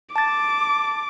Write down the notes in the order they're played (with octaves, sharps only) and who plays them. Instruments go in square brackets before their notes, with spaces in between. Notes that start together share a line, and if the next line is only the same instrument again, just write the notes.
[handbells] A5 A6 [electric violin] D6